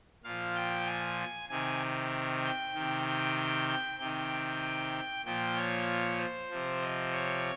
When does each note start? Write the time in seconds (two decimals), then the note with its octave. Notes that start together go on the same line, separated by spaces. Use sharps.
0.24 A#2 F3 F5
0.55 G5
0.87 G#5
1.49 C3 D#3 G#5
2.44 G5
2.74 C3 D#3
3.07 G5
3.69 G5
3.99 C3 D#3 G5
5.25 A#2 F3 G5
5.56 C#5
6.19 C5
6.51 C3 F3
6.82 D#5
7.13 C#5